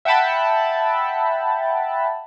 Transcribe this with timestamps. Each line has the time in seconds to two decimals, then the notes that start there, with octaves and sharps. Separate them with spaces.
0.05 E5 F#5 G5 A5 B5